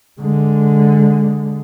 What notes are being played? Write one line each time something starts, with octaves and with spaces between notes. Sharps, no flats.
D3 G#3